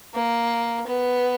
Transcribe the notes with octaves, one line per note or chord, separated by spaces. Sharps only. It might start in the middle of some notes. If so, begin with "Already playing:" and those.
A#3
B3